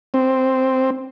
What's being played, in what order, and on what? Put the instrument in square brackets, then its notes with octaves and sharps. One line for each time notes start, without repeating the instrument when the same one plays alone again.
[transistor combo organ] C4